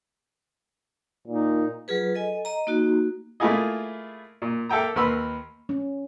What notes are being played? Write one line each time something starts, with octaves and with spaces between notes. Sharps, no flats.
A#2 D#4
F#3 F4 G#4 B4
A4 D#5 G#5
D#5 A#5
A#3 D#4 F#4
A3 A#3 E4 F4 G#4 D#5
A#2
A#3 A4 E5 G5 A#5
D#2 A#4 B4 B5 C6 E6
C#4